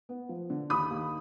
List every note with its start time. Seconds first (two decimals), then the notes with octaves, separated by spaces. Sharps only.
0.09 B3
0.29 F3
0.50 D3
0.70 D#2 B5 D#6
0.90 D#2